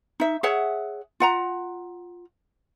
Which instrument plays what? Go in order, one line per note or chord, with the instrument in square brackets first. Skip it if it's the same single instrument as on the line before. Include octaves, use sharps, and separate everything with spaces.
[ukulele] D#4 E5
G#4 C#5 E5 F#5
F4 F#5 A#5